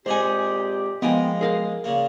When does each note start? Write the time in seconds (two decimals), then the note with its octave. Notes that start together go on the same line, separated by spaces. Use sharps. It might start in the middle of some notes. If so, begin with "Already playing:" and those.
0.06 A#2 G#3 C4 G4 G#4 C5 F#5 G#5
1.02 F3 G#3 A#3 B3 D#4 G5 G#5
1.41 G#4 A#4 F5
1.84 A#2 C#3 A#3